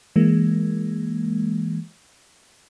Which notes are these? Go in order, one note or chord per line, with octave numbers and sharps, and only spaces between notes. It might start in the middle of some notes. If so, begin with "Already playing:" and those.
E3 G#3 A#3